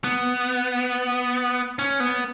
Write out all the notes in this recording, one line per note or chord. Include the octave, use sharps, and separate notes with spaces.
B3
C#4
B3